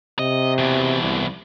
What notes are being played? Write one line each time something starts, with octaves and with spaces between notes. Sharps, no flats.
C3 D#5
E2 B2
C2